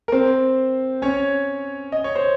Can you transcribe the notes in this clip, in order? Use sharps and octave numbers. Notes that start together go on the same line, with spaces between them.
A#4
C4 C5
C#4 C#5
D#5
C#5
C5